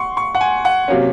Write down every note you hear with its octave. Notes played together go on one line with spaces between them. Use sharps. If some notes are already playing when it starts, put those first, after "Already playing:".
Already playing: F#5 C6 C#6
C#6
F#5
G#5
F#5
C3 F#3 A#3 C#4